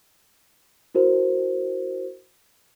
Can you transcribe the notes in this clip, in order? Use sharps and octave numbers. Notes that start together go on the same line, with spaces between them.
E4 F#4 A#4 C5